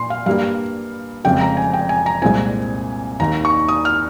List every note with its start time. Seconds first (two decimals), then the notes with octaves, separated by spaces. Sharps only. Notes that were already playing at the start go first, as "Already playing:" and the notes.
Already playing: A#2 C6
0.10 F5
0.26 G2 G3 A#3 F5
1.24 F1 F2 C#3 G#3 G5
1.41 A#5
1.57 G#5
1.73 G5
1.89 G#5
2.06 A#5
2.22 C2 A#2 G#3 C4 G#5
3.20 D#2 D#3 A#3 A#5
3.45 C#6
3.68 D#6
3.85 F6